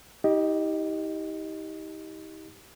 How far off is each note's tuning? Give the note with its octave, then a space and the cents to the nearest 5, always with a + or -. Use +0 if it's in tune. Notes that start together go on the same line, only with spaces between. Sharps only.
D#4 +45 G4 +0 D#5 +0